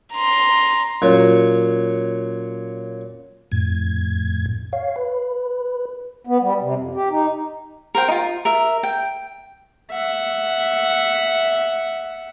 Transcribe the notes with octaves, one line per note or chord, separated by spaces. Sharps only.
A#5 C6
A#2 F#3 C#4
F2 A2 G#6
C#5 F5
B4
B3
G3
C3
F2
G4
D#4
A#4 C5 G5
D#4 F4
A#4 E5
G5
E5 F#5